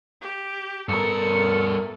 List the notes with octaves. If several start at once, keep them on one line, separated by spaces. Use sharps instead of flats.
G4
G2 B3 A4 A#4 C#7